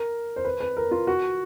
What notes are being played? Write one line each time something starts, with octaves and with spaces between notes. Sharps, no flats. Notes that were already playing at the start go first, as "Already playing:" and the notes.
Already playing: A#4
C5
B4
B4
A#4
F4
F#4